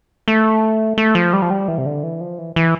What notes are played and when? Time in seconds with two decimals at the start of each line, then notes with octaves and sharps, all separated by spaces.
0.28 A3
0.98 A3
1.15 F3
1.33 G3
1.42 F3
1.50 G3
1.68 E3
1.78 C3
1.86 D3
2.03 E3
2.21 F3
2.39 E3
2.56 E3